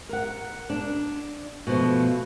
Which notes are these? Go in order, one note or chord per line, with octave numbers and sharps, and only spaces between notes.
A#4 F#5
D4
B2 F3 A3